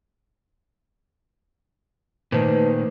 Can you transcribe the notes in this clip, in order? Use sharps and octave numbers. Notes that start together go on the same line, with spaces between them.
A#2 D#3 A3 B4 C5